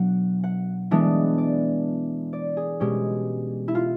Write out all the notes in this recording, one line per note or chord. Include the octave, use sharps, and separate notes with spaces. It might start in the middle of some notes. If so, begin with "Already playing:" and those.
Already playing: B2 F#3 D4 F#5
F#5
E3 G#3 B3 D4
D5
D5
G#4
B2 G#3 C#4 G4
E4
F4